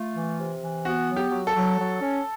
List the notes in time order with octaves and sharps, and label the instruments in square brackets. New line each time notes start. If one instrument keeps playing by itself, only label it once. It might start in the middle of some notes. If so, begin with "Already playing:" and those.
Already playing: [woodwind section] A3 [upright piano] F4
[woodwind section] E3
C3
E3
[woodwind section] B3 [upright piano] F#4
[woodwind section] F#3
[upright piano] G4
[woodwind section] F#3
[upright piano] A4
[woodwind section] F#3
F#3
C#4